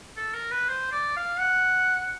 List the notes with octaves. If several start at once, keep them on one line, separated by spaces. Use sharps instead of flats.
A4
A#4
B4
C5
D5
F5
F#5